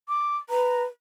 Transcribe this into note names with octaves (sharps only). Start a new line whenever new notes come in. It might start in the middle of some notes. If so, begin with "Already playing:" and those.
D6
B4 A#5